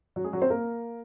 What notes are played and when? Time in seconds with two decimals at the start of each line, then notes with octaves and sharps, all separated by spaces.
0.16 F#3 F#4
0.24 G#3 G#4
0.33 F#3 F#4
0.42 C4 C5
0.50 A#3 A#4